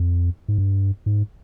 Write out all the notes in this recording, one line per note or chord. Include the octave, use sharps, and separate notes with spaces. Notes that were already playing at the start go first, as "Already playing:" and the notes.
Already playing: F2
G#2
G2
G#2